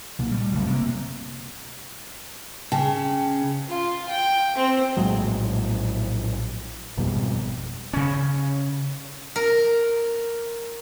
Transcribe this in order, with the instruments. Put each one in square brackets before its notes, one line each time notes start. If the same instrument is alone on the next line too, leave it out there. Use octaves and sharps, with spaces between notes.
[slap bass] C2 A#2
G3 A3
F#1 C2
C3 A#3
[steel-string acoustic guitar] C#3 [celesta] G5 A5
[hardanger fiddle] F4
G5
C4
[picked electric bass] A#1 A2 F#3 G#3
G#1 F2 B2 G3
[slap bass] C#3 C#4
[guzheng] A#4